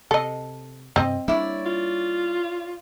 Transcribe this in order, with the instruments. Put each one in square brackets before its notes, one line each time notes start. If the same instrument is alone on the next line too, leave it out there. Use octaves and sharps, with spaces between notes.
[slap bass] C3 [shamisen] A4 D#5
[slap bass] G2 C3 [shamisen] C4 D#5
[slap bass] G3 A#3 D4 [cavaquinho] E4 C#5 D5
[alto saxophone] F4